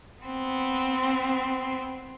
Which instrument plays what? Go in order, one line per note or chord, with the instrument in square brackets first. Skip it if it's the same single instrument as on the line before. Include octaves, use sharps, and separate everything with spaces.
[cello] B3 C4